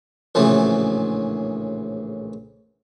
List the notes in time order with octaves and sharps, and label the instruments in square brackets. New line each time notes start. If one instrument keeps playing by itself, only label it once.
[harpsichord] A#1 A2 C#3 E3 F#3